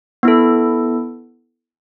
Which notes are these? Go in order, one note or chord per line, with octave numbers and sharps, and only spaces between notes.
B3 E4 A4